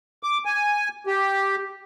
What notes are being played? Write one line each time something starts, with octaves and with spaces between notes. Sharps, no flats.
D6
G#5
G4